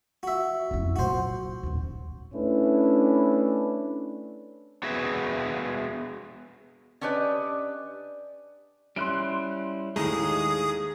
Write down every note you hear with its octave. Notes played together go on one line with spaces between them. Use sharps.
F#4 E5
F2 E4
A#2 F#3 F#4 C5
A1 D#2
A3 C#4 D4 E4 B4
B3 F#4 G#4 E5
C#4 D4 G4 B4 D5 D#5
G3 C#4 E4 C6 F#6 D7
D#2 A2 G#3 G#4 A#5 D#6